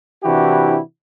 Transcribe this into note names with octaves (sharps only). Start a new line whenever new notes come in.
C3 E3 D4 E4 F#4 G4